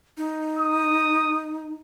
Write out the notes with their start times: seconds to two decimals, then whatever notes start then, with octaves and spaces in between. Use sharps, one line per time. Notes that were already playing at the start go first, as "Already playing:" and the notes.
0.18 D#4
0.58 D#6